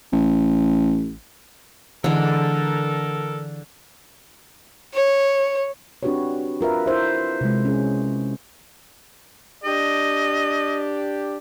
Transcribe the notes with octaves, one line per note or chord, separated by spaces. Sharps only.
A1
D3 E3 G#3 A4 A#4
C#5
C4 D4 F#4 G4 B4 C#5
F4 A#4 B4 E5
E4 A#4 C5 E5
C3 G#3
C#4 G#4
D4 G4 D#5